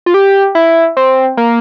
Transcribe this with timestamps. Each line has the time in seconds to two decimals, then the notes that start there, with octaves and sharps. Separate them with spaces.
0.06 F4
0.14 G4
0.55 E4
0.97 C4
1.37 A#3